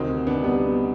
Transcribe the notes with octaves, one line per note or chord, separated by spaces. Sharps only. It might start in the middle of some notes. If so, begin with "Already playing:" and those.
Already playing: D2 C3 D#3 C4 D#4
B3 D4
G3 B3